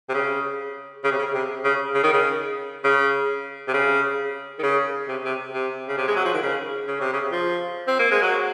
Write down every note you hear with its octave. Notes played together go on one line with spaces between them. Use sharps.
C3
C#3
C#3
C3
C#3
C3
C#3
C#3
D#3
C#3
C#3
C3
C#3
D#3
C#3
C3
C3
C3
C#3
C3
G#3
F#3
F3
D#3
C#3
C#3
C3
C#3
F3
C4
A#3
G#3
F#3